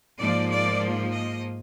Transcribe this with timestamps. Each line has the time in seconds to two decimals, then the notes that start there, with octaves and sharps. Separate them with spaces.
0.18 G#2 F3 A#3 D5
0.50 D5
1.11 D#5